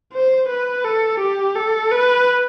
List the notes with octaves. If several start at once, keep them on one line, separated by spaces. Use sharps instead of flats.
C5
B4
A4
G4
A4
B4